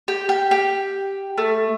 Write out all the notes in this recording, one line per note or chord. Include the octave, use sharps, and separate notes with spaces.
G4
G4
G4
A3